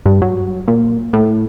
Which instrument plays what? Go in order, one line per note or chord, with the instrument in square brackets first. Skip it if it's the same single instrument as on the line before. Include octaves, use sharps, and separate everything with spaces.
[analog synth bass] G2
F#3
A#2
A2